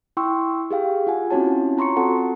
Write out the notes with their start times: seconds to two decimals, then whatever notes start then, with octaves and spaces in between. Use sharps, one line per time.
0.17 E4 G5 C6 C#6 E6
0.71 G4 G#4 F5 G5
1.07 F4 F#5 G#5
1.30 C4 C#4 E4 F#4 C#5 A5
1.78 F4 A#5 C6 C#6 C#7
1.97 C4 F#4 A4 F#5 A5